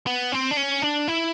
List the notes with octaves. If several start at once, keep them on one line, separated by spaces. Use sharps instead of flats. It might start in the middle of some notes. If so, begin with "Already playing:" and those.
B3
C4
D4
C#4
D4
E4